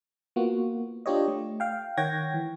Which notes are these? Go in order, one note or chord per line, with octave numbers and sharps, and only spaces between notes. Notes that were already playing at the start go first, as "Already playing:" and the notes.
A#3 B3 F4 F#4
D4 F4 G4 C#5 D#5
A3
F5 G5
D#3 C#5 F#5 G5 G#6 A#6
E3